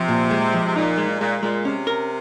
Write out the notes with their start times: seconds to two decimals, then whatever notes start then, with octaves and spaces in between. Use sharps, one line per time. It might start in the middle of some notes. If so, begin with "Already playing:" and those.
Already playing: C3 F3
0.09 A#2
0.31 G#3
0.54 F3
0.66 C3
0.76 A#2 D#4
0.98 G#3
1.21 A#2 G#3
1.43 A#2 G#3
1.65 C3 C#4
1.87 A#4